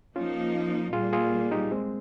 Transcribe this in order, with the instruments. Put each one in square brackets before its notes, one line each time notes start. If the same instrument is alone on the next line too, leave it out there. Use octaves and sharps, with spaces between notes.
[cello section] F3 A#3 D#4 [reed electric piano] C#4 F4
[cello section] A#2 G3 A#3 [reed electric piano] F4 G#4
[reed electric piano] F4 G#4
D#4 G4
G#3 C4